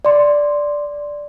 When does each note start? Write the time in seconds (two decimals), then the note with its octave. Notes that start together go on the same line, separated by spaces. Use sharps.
0.05 D5 C6